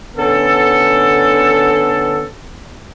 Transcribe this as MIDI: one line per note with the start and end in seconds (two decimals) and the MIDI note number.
0.17 2.26 50
0.17 2.26 59
0.17 2.26 61
0.17 2.26 69